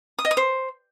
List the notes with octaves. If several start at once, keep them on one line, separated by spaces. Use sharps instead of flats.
D#6
D#5
D#6
C5